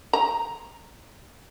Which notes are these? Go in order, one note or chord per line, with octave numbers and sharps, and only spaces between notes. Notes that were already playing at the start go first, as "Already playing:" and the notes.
A#5